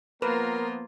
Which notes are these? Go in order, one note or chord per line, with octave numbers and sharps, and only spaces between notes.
F3 A#3 B3 F4 A#4 B4